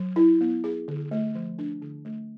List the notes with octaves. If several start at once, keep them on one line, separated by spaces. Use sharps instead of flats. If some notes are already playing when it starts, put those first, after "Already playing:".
Already playing: F#3
E4
B3
G#4
D3
A3
F3
D4
D3
A3